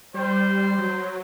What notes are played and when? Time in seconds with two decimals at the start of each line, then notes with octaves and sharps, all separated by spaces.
0.14 G3 C5
0.78 F#3